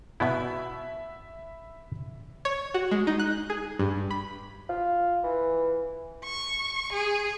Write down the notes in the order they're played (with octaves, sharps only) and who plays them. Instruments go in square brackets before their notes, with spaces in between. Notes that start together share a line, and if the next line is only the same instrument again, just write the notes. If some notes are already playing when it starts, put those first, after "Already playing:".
[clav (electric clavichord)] B2 B3 E4 [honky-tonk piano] E5 B5
[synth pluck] C#5
F#4
G#3
D#4
F#6
G#4
G2
B5
[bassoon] F4
E3
[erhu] C#6
G#4